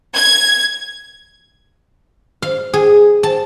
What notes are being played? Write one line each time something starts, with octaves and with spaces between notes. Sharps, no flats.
G#6
F5
G#4
A5